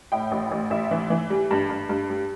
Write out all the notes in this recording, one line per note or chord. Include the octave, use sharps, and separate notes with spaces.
A2 G5
A1
A1
A1 E5
E3
E3
G3
G2
G2
G2
G3